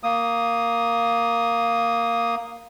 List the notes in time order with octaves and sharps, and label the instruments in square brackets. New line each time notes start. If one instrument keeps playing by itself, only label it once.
[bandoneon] A#3 D#6